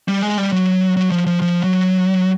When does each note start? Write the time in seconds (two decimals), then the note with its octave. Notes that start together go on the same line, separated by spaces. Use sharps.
0.08 G3
0.22 G#3
0.38 G3
0.52 F#3
0.97 F#3
1.11 F3
1.26 F3
1.42 F3
1.63 F#3